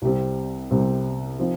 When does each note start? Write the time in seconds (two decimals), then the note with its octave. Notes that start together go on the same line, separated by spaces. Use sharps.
0.02 C2 C3 G3 C4
0.71 C2 C3 G3 C4
1.39 F3 C4 D#4